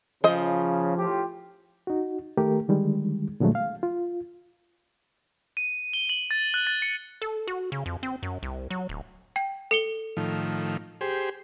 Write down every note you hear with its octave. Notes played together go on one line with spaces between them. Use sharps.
C#3 F3 C5 D#5
A2 F4 G4
D#4 F#4
D#3 A3 G4 A#4
D3 D#3 G3 G#3
A#2 D3 F3 F#3 G#3 A3
F5
F4
D#7
G7
F#7
A6
F#6
A6
C#7
A4
F#4
C#3
F2
C4
F#2
C2
F#3
D1
G5
A4 C#7 G7
A2 D#3 F3
G4 G#4 C5